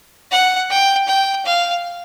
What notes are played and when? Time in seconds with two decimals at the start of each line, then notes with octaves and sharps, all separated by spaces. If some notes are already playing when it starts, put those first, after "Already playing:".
0.31 F#5
0.70 G5
1.08 G5
1.45 F5